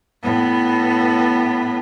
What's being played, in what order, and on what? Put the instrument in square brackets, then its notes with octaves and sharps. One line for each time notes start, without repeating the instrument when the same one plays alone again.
[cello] A2 B3